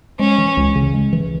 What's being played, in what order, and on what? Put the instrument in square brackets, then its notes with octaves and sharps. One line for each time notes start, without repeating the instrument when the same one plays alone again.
[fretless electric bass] G#3 [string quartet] C#4
[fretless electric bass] E3
C#2
C#3
G#3
E3